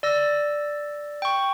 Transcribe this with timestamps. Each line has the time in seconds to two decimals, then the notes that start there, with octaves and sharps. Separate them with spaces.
0.03 D5 E6 A#6
1.22 G5 C#6